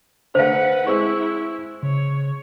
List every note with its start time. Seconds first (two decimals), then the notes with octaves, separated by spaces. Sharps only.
0.35 D3 A3 B4 C5 F5 F#5
0.87 G#3 C4 E4 C#6 E6
1.83 C#3 C#5